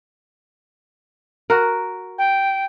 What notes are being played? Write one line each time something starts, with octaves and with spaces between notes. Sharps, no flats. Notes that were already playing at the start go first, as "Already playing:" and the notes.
F#4 A#4
G5